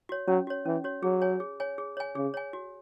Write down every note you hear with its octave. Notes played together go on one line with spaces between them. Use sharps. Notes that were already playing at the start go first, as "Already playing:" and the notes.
F#4 C#5
F#3 C#4
F#4 C#5
E3 C#4
F#4 C#5
F#3 G#4
C#5 G#5
G#4
C#5 G#5
G#4
C#5 G#5
C#3 G#4
C#5 G#5
F#4